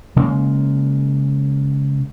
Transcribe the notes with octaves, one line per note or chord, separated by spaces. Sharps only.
C#3 G#3 A#3